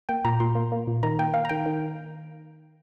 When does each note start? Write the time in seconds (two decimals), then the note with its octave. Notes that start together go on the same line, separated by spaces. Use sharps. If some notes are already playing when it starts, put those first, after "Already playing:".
0.09 A#3 G5
0.25 A#2 A#5
0.40 A#2 C6
0.55 A#3
0.72 A#3
0.87 A#2
1.03 D#3 A#5
1.19 A#3 G5
1.34 A#3 F5
1.45 A#5
1.49 D#3 G5
1.66 D#3